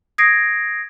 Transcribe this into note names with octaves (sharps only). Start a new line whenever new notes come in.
D#6 G#6 A#6 C7 D7